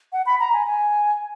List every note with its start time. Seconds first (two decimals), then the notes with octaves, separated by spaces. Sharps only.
0.13 F#5
0.26 B5
0.40 A#5
0.53 G#5
0.67 G#5